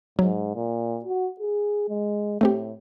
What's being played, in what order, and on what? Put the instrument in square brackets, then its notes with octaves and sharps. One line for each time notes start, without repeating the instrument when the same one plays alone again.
[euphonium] G#2 [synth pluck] F#3
[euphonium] A#2
F#4
G#4
G#3
[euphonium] A2 [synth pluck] A3 C4 G4